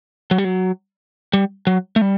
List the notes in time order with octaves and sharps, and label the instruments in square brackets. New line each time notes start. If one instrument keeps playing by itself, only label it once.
[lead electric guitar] F#3
G3
F#3
G3
F#3
A3
G3